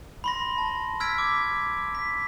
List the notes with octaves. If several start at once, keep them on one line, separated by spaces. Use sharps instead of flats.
B5 C6 A#6
A5
E6 F6 G#6 B6 D7
D6
B6